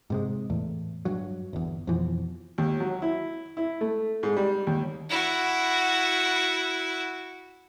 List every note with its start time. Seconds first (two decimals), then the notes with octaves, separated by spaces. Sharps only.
0.10 G#2 C3 G#3
0.50 E2 A2
1.05 G2 F#3
1.53 G1 E2
1.87 F2 B2 E3 F3
2.58 D#2
2.80 F#3
3.02 E4
3.57 E4
3.81 A3
4.23 G#2
4.37 G3
4.67 D#2
5.09 E4 F#4